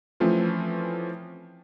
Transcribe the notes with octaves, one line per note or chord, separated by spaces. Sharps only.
E3 F3 A3 C4 C#4 F4